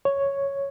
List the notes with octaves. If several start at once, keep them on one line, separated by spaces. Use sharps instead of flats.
C#5